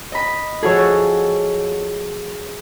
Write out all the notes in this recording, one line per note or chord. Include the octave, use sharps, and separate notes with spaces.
D#5 B5
F3 F#4 G#4 A4 C#5